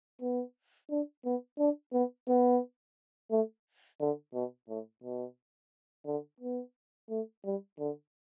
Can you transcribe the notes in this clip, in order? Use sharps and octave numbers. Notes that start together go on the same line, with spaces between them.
B3
D4
B3
D4
B3
B3
A3
D3
B2
A2
B2
D3
B3
A3
G3
D3